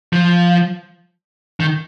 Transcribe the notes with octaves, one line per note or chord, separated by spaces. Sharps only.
F3
D#3